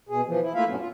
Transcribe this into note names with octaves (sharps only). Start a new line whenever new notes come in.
B2 G#4
E3 F3
E4
A3 A#3 E4 F4 E5 F5
G2 B2 F#3 B3 C#4
F4